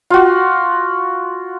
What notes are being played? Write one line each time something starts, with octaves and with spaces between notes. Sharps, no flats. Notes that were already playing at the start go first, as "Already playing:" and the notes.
F4 F#4